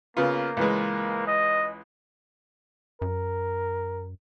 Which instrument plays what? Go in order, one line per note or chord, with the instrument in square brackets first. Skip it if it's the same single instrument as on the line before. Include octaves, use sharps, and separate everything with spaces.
[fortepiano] C#3 B3 F4 [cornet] A#3
[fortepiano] C#2 E3 G#3
[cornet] D#5
[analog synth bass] F#2 [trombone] A#4